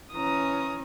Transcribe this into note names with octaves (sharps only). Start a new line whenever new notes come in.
E3 C#4 A#5 D#6